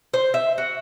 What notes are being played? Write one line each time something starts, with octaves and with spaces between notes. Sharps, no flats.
C5
E5
F#4